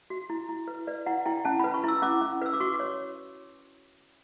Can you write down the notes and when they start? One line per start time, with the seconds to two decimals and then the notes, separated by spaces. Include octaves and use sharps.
0.10 F#4
0.30 E4
0.49 E4
0.68 B4
0.87 B4 D5
1.06 E4 F#5
1.26 E4 G5
1.45 C#4 A5
1.60 B4 B5
1.74 C#6
1.84 E4 E6
2.02 C#4 D6
2.21 C#4
2.42 B4 E6
2.53 D6
2.60 F#4 C#6
2.75 D6
2.80 C#5